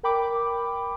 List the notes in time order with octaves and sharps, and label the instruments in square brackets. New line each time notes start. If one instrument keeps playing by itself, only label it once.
[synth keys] A#4 G5 B5 D6